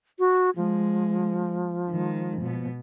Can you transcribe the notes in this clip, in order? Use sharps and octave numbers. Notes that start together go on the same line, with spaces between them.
F#4
F3 G#3
D#3 G#3
B2 B3